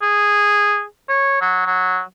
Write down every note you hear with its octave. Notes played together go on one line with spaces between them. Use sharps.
G#4
C#5
F#3
F#3